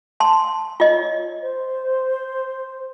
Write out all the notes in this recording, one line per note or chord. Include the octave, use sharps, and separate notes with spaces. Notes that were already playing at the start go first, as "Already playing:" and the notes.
A5 C6
F4 C#5 D#5
C5